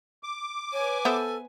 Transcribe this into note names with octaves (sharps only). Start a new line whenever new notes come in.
D6
B4 C#5 G#5
B3 A4 C5 E5